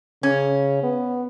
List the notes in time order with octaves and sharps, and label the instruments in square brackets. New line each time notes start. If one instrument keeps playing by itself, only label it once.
[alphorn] C#3 [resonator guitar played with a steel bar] C#4
[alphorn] B3